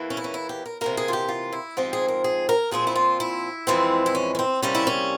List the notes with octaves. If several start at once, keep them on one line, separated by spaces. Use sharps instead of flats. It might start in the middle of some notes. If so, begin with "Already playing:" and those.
Already playing: E2 E3 A#3
C#4
E4
C#4
E4
G4
A#4
C3 E3 A#3 A#4
G#4
F4
G4
F4
E4
G#2 F3 C4 G4
G#4
A#4
G#4
A#4
A#2 F3 C4 G#4
E4
F4
E4
F2 E3 G#3 C4
E4
C#4
C#4
C4
E2 C3 G3 A#3 C#4
E4
C#4